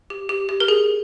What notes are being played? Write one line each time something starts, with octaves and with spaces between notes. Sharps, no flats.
G4
G4
G4
A#4
G#4